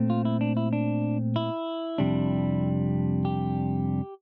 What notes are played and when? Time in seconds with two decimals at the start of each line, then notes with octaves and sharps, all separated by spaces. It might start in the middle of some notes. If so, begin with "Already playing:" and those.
Already playing: A#2 A3 C4
0.10 F4
0.25 E4
0.41 D4
0.57 E4
0.73 D4
1.36 E4
1.98 F2 C3 G3 D4
3.25 G4